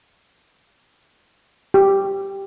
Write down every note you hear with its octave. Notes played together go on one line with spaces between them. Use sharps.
G4